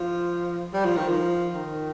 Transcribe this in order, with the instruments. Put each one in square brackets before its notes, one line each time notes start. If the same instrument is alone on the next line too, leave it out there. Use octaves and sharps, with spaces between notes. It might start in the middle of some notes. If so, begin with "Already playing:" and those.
Already playing: [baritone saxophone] F3
G3
F3
D#3
F3
D#3